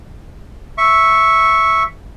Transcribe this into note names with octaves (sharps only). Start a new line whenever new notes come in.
E5 C#6